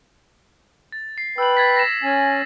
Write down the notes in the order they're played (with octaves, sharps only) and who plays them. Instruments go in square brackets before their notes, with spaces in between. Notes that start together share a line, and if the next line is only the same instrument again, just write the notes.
[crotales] A6
C7
[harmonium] B4 G5 [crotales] E6 F#7
[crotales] G#6 A6 B6
A#6 E7
[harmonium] C#4 G#5